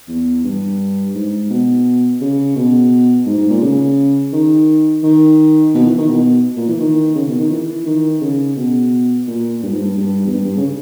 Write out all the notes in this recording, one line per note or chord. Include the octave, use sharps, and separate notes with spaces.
E2
G2
G#2
B2
C#3
B2
G#2
G#2
A#2
C#3
D#3
D#3
B2
E3
D#3
B2
A#2
E3
D#3
C#3
B2
D#3
E3
D#3
C#3
B2
A#2
G2
G#2
G2
G2
E2
G2
G2
C#3